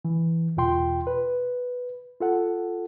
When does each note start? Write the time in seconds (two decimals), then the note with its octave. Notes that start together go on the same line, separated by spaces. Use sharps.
0.05 E3
0.57 E2 B2 F4 G5 C6
1.07 B4
2.21 F4 A4 F#5